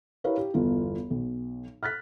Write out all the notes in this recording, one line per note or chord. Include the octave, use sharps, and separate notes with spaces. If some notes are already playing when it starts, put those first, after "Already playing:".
E4 G4 A#4 B4 C#5 F5
G4
G1 E2 F4
B1
F6 F#6 A6 B6